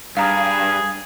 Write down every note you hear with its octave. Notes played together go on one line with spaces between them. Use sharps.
G2 G#4 F5 A#5 D#6